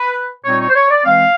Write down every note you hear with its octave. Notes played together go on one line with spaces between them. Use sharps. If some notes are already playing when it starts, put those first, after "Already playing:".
Already playing: B4
A#2 G3 C4 D#4 C#5
C#5
C5
C#5
D5
E3 G#3 C4 F5